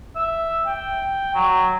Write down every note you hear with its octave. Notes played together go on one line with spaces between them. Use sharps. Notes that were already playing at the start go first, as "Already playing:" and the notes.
E5
G5
F#3